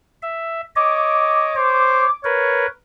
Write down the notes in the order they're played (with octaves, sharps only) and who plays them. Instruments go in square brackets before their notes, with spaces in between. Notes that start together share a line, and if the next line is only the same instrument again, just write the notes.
[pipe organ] E5
[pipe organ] C#5 D#5 [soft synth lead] D6
[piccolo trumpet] C5 [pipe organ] C#5
[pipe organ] A#4 B4 [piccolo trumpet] C#5